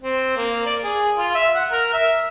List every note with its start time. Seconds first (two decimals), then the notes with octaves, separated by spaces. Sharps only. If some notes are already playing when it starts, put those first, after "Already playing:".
0.01 C4
0.37 A#3
0.66 D5
0.84 G#4
1.18 F4
1.35 E5
1.55 F#5
1.71 A#4
1.93 E5